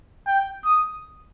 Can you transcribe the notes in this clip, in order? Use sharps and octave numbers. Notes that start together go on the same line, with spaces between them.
G5
D#6